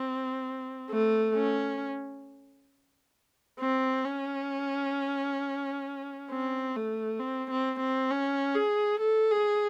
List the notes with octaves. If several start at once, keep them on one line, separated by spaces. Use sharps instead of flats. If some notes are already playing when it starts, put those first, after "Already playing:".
Already playing: C4
A3
C#4
C4
C#4
C4
A3
C4
C4
C4
C#4
G#4
A4
G#4